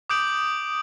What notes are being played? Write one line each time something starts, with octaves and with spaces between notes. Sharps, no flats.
D6 D#6 G6 D7 F#7